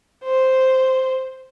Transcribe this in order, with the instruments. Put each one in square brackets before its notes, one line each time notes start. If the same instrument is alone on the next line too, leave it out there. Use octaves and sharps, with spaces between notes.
[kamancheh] C5